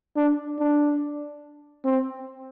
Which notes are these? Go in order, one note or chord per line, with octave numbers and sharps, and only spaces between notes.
D4
D4
C4